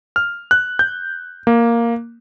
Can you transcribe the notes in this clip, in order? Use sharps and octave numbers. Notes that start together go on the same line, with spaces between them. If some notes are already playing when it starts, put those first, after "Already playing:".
F6
F#6
G6
A#3